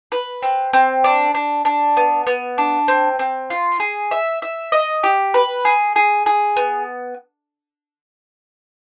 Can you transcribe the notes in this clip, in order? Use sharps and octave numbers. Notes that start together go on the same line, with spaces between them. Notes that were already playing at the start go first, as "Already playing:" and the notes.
B4
C4
C4
D4
D4
D4
B3
B3
D4
C4
C4
F4
G#4
E5
E5
D#5
G4
B4
G#4
G#4
G#4
B3